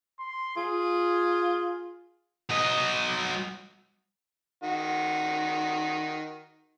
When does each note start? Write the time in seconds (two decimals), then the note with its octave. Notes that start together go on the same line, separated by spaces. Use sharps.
0.19 C6
0.57 F4 G#4
2.50 F#3 D#5
4.63 D#3 F#4